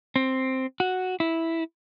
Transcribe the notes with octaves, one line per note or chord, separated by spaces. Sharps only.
C4
F#4
E4